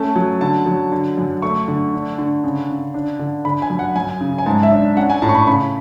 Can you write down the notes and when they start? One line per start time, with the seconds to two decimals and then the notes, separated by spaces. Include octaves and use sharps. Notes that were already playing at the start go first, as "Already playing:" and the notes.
Already playing: A3 C#4 A5
0.16 F#3
0.41 D3 A5
0.66 F#3
0.92 D3
1.18 F#2
1.42 A3 C#6
1.68 D3
1.93 D4
2.18 D3
2.44 C#3
2.69 C#3
2.94 D4
3.19 D3
3.45 D3 B5
3.62 G#5
3.70 F#2
3.79 F#5
3.96 F#2 G#5
4.21 C#3
4.38 G#5
4.46 G#2 A5
4.63 E5
4.72 D4
4.97 C#4 F#5
5.10 G#5
5.22 A2 A5
5.29 C#6
5.35 B5
5.47 C#3 B5